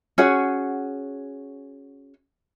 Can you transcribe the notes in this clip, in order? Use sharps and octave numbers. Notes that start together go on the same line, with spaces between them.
C#4 F#4 G#4 F#5